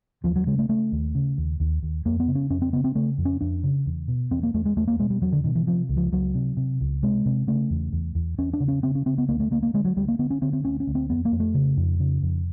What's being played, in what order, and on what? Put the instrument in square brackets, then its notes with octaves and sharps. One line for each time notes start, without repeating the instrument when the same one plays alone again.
[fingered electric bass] D#2 F3
F#3
C#3 G#3
A3
C#3 A3
D#2
C#3
D#2
D#2
D#2
F2 A#3
B3
C#3
C#4
F2 C#4
C4
C#3 B3
C4
C#3 A3
F2
C#4
F2 D4
C#3
E2
B2
E2 C4
A#3
E2 A3
G#3
E2 A3
A#3
B2 G#3
G3
E2 F#3
D3
B2 D#3
E3
C3 F3
C#2
F3
C#2 F#3
C3
C3
C#2
C3 G#3
C3
C#3 A3
E2
E2
E2
E2 C#4
D4
C#3
C#4
C#3 C4
C#4
C#3 C4
B3
D2 A#3
A3
D2 A#3
A#3
D3 G#3
F#3
D2 G3
A#3
D3 B3
C#4
D3 C4
C4
D2 C#4
C#4
D2
C4
F2 B3
A#3
F2
A3
C#3
F2
C#3
F2